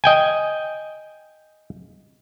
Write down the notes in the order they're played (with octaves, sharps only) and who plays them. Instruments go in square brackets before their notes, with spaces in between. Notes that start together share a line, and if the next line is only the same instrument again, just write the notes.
[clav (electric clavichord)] D#5 G5 G#5